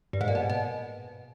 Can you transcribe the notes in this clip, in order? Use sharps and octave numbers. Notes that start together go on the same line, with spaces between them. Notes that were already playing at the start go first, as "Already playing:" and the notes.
G2
G#2
A#2
B2
B2